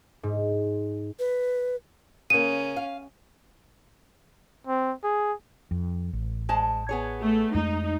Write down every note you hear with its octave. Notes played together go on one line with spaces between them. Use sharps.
G#2
B4
C#3 A#3 C#4 D#7
F5
C4
G#4
F2
A1
G#3 C5 A5
B3 G#4 C#5
A3
F2 G#3 A3 D#4